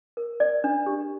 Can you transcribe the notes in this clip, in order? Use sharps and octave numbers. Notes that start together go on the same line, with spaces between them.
A#4
D5
D4
G4